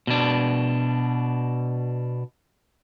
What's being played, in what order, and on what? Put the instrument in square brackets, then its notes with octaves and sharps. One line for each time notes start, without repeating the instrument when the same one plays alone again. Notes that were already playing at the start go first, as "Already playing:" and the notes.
[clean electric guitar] B2 D4